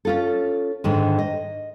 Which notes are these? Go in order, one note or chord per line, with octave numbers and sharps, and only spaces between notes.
C#4 F4 A4
G#2 D3 D#3
D#5